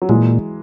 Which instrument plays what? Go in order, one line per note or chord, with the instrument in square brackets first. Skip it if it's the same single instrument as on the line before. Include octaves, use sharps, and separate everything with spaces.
[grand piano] F#3
[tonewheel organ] A#2 [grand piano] E3 G#3